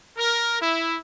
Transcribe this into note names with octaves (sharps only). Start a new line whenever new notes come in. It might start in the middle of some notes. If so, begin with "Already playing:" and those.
A#4
E4